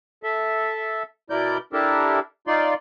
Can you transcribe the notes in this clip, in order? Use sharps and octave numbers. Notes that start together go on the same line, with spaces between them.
A4 E5
B2 E4 A#4 D5 G6
D4 E4 G4 A4 A#4
D#4 F4 D5 C6